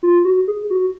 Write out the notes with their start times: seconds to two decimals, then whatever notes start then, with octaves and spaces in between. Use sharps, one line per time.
0.03 F4
0.25 F#4
0.48 G#4
0.70 F#4